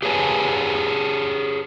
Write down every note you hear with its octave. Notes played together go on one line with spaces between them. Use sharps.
G4 G#4 B4 C#5 G#5 A5